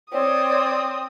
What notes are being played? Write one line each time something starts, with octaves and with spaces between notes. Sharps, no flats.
C4 C#5 D5 D#6